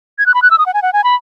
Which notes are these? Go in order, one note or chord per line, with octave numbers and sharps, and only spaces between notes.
G#6
F#6
B5
F#6
E6
D#6
F#5
G#5
F#5
G#5
B5